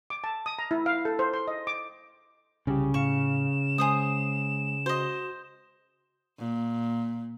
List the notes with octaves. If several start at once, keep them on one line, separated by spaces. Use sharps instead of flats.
D6
A5
D#6
A#5
E4
F5
A4
C5
C6
D#5
D6
C2 C#3 G4
A2 F5 C#6 E7
G#3 G#4 C5 D#6
F#4 C5 D#5
A#2